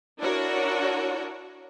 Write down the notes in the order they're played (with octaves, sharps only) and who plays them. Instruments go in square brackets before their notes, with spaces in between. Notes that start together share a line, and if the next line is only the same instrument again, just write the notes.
[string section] D4 E4 F#4 A#4 C#5